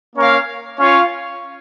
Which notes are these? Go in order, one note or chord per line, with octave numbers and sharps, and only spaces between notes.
A#3 C#4 A#4 C#5 F5
C#4 F4 C#5 F5